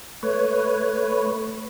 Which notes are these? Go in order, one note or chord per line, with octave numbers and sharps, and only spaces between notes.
A3 B4 C#5